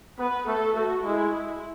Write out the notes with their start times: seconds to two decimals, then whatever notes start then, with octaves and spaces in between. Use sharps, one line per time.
0.19 B3 B4
0.47 A3 A4
0.75 A3 F#4
1.04 G#3 E4
1.33 E4